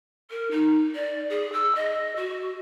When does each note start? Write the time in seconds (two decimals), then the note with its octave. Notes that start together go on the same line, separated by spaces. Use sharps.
0.30 A#4
0.50 D#4
0.94 D5
1.29 G#4
1.52 E6
1.75 D#5
2.16 F#4